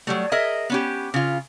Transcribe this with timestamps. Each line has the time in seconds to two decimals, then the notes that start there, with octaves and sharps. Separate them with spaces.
0.07 F#3 G3 A3
0.32 G#4 A#4 D#5 E5
0.70 B3 C#4 G4
1.14 C#3 F4